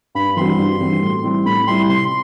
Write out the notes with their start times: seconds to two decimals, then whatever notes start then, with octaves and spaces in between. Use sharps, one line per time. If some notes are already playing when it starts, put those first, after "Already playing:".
0.15 G2 B5
0.37 E3 G3 C4 F#4 C6
0.59 G2
0.80 E3 G3 C4 F#4
1.03 A2
1.24 G3 C4 E4
1.46 A2 B5
1.67 G3 C4 E4 C6
1.89 C3 C6